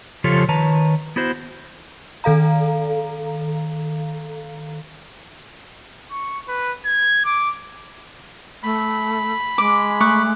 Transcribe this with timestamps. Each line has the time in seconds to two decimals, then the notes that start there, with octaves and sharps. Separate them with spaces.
0.24 C#3 F3 F4 G4 A4 C#5
0.49 D#3 B4 C#5 A5 A#5
1.16 B3 E4 F#4 C5
2.24 D#3 A4 F5 A#5
6.12 C#6
6.48 B4
6.85 G#6
7.25 D6
8.63 A3 B5
9.58 G#3 D6
10.01 A3 C#6 D6 F#6